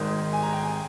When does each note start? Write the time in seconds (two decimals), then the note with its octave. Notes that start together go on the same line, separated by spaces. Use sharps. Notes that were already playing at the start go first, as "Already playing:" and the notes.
Already playing: G#1 G#2 D#3
0.33 G#5
0.43 A#5
0.53 G5
0.64 G#5